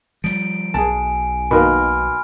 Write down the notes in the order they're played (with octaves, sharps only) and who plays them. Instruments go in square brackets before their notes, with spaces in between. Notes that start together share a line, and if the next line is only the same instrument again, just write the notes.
[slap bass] F3 G3 [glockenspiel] D7
[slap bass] B1 [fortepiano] G#4 A5 [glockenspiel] G#5
[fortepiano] B2 D#3 A#3 [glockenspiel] B5 C6 F6